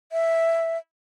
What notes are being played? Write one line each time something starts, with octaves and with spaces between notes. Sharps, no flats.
E5